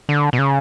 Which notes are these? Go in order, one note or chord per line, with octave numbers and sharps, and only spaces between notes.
D3
B2
C#3